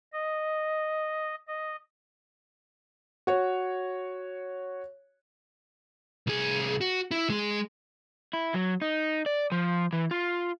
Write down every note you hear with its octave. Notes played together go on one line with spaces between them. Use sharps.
D#5
D#5
F#4 C#5
C2 G#4
F#4
E4
G#3 G#4
E4
F#3
D#4
D5
F3
E3
F4